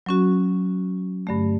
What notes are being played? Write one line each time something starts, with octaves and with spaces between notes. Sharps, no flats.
F#3 C#4 F#4
G2 D3 A3